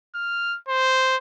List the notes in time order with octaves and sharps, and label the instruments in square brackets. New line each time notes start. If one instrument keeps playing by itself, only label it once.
[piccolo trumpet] F6
C5